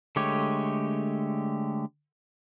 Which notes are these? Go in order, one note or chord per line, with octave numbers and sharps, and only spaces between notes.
D3 G#3 A3 G4 C#5